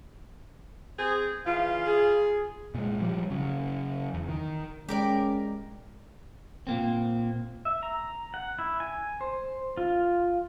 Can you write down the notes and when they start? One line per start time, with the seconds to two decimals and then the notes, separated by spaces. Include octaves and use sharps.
0.97 C4 G#4
1.45 C#3 E3 F4 F5
1.86 G#4
2.75 A#2 G#3
3.01 F3 G3
3.30 C#3 F#3
4.14 E2
4.29 D#3
4.89 G#3 C#4 G4 A#4 D5
6.67 A#2 A#3 C4
7.65 E5
7.83 A#5
8.34 F#5
8.59 E4
8.80 G#5
9.21 C5
9.77 F4